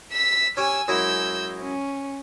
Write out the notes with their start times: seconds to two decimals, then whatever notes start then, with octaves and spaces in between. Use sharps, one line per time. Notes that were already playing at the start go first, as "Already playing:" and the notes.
0.12 E6 B6
0.57 C#4 G4 G#5 E6
0.88 F#2 G#3 E4 E6 G6
1.60 C#4